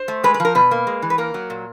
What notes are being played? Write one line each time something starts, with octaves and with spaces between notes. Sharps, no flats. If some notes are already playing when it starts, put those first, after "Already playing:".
Already playing: C5
A3
G#3 B4
B4
F3 A#4
B2 B4
A#3
G#3
E3
B4
A#3 A#4
F#3
A#2